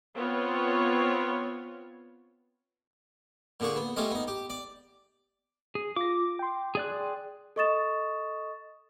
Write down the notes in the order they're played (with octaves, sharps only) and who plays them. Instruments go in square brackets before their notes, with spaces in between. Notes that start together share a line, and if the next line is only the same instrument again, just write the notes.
[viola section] B3 C4 F4 C#5
[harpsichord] A#2 D3 D4 G#4 C#6
B3
G3 A3 C#4 F4 D#5
B3 D#4
G4
D5
[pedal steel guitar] G#4
[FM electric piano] F4 A#6 [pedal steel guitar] D6
[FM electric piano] G5 C6
[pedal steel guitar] G#4 D5 F#6
[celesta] A4 D#5 C#6 D#6 A6 E7